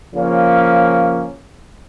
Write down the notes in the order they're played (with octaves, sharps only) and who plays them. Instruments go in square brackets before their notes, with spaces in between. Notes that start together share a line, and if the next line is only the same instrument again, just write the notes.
[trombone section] C#3 F3 A#3 C#4